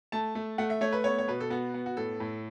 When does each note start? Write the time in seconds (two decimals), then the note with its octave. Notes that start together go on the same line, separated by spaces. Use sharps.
0.12 A3 A5
0.35 A3
0.58 A3 F#5
0.70 E5
0.81 A3 C#5
0.92 B4
1.04 B3 C#5
1.18 C#5
1.28 B2 B4
1.40 A4
1.50 B3 F#4
1.74 B3
1.86 F#4
1.97 A2 A4
2.20 A2